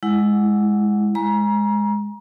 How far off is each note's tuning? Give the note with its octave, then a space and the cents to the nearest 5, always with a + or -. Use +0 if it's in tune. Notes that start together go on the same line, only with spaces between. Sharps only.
G#3 +0 E4 +0 F#5 +0
G#3 +0 A#5 +30